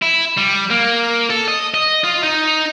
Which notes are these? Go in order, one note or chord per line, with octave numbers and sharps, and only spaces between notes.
E4
G3
A#3
A4
D#5
D#5
F4
D#4